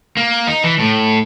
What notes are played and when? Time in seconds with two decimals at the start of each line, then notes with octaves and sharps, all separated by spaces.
0.17 A#3
0.47 D#4
0.64 E3
0.79 A2